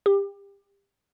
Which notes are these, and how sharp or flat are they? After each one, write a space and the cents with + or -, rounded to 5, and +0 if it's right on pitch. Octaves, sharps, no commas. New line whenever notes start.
G4 +25